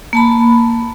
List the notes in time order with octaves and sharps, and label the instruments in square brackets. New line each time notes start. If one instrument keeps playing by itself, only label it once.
[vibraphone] A#3 A5 B5